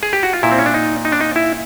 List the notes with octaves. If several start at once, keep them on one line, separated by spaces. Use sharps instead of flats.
G#4
G4
F#4
F4
A#2 E4
C4
C#4
D4
D#4
D#4
D4
D#4
E4